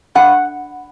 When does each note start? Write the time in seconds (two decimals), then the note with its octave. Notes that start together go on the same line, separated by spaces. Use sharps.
0.15 G2 F#5